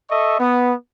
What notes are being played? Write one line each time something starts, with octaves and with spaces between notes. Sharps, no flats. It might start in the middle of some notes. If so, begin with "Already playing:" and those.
A4 D#5 E5 C#6
B3